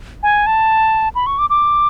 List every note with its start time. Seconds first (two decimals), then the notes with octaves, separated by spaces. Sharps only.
0.23 G#5
0.47 A5
1.15 B5
1.26 C#6
1.39 D6
1.50 D6